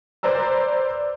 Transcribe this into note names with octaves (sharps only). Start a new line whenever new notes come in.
B4 C5 D5 A#5 E6